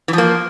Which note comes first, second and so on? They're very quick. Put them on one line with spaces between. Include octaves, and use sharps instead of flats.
E3 F3 A#3